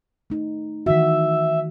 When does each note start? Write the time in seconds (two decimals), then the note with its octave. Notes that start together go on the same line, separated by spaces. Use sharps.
0.30 A3 D#4
0.86 D#3 E3 F#4 E5